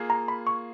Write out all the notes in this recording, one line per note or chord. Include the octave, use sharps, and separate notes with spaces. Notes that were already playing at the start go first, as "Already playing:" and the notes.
Already playing: A#3 F4 G#4
A#5
B5
C#6